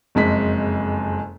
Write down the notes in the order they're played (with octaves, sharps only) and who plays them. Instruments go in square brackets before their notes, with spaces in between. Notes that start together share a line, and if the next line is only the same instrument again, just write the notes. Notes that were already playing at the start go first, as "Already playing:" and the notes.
[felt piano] F#1 F2 G#3 B6